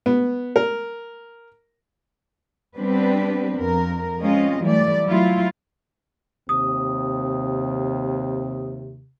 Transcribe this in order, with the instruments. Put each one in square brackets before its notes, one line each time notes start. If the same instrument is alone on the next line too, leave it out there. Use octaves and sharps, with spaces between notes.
[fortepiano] B3
A#4
[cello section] G3 B3 C4 D4 G4 B4
F2 A#4
G#3 C4 C#4 F4 D#5
E3 F#3 G3 A3 D5
F#3 A3 E4 F4
[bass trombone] D#2 [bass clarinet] C3 [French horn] C4 [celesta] D#6